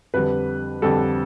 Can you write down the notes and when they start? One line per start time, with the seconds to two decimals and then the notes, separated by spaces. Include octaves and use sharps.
0.14 F2 D3 G3 B4
0.82 F2 D3 G3 A4